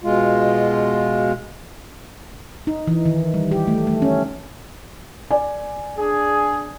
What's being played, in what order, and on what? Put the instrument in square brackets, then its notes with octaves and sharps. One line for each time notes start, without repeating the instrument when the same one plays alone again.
[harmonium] B2 G#3 F4
[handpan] D#4
E3
D#3
G3
G4
A3
A3
C#4
[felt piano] D5 G#5
[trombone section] D4 G#4